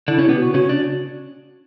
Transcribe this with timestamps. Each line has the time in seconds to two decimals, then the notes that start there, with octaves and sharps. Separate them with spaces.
0.08 D3 D4 E4
0.18 C#3 C#4
0.24 B2 B3 G4
0.39 F#4
0.54 C#3 C#4 F#4
0.69 D4